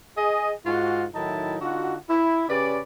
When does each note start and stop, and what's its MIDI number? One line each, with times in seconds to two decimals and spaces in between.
0.17 0.52 68
0.17 0.52 75
0.66 1.05 44
0.66 1.05 65
0.66 1.05 66
1.15 1.57 45
1.15 1.57 51
1.15 1.57 54
1.15 1.57 63
1.15 1.57 64
1.15 1.57 81
1.60 1.96 50
1.60 1.96 63
1.60 1.96 65
1.60 1.96 66
2.09 2.44 64
2.49 2.79 49
2.49 2.79 61
2.49 2.79 67
2.49 2.79 71
2.49 2.79 74